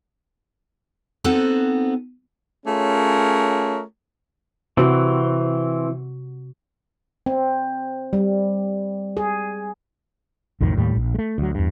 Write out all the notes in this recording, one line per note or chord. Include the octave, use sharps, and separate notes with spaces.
B3 C4 D#4 F#4 A4 C5
A3 C#4 F4 G#4 A#4 C#5
C3 E3 C4 F#4
C4
G3
G#4
B1 F2 A2 D#3
D#2 A2 G3
A#1
G#3 A3
D2 F#3
E2 G2